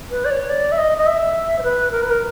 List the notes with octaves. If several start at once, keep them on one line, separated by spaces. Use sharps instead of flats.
B4
D5
C#5
D5
E5
D#5
D#5
E5
C5
B4
A#4
B4
A#4